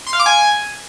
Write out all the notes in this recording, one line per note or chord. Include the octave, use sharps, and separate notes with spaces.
C6
F5
D6
G#5